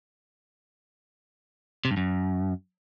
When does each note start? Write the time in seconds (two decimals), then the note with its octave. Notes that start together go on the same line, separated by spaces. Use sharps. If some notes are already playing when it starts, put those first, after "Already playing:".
1.85 C3
1.91 G2
1.97 F#2